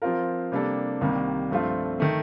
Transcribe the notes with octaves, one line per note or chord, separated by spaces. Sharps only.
F3 C4 F4 A#4
C3 G3 A#3 D4 A4
C2 C3 D#3 G3 A#3
G2 F3 A3 C4 F4
D#3 A3